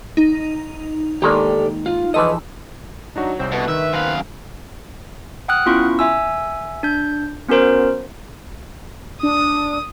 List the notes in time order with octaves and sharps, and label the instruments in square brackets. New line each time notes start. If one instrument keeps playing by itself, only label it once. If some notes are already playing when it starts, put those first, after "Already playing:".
[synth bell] D#4
[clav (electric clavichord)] D#3 G#3 A#3 [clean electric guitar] G4 A4 D5
[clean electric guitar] F4
[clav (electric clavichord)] E3 F3 A4 [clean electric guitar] G#4 B4 D#5 [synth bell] E6
[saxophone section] F#3 [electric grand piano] D4 D#4 F#4
[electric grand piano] C2 [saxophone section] G#2 F#3 C4
[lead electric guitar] B2 [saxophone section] D3 A3 B4
[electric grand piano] D#3 [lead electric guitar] E5
[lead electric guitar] F#2 F5 [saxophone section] B3 C4 B4
[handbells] F#5 G5 D#6 F6 F#6
B3 C#4 E4 F4 C#6
E5 G#5 E6
D4 G6
B3 C#4 F#4 A#4 C5
[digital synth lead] D4 [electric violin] D#6